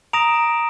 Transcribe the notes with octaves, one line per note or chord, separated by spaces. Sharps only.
A#5 D#6 A#6 D7 F7